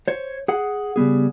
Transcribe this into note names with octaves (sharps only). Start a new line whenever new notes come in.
C5 C#5
G#4 F#5
C#3 G3 B3 G#4